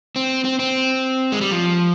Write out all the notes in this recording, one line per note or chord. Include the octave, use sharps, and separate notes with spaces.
C4
C4
C4
G#3
G3
F3